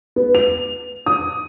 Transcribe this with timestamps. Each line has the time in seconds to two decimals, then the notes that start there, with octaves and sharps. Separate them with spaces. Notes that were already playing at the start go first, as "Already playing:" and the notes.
0.16 B3
0.35 F7
1.06 D#6